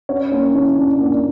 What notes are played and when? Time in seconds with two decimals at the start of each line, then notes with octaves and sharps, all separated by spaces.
0.09 C#4 C#5
0.32 A#3 C#4 C#5
0.54 E3 C#4 C#5
0.77 C#4 D4 D5
1.00 A#3 D4 D5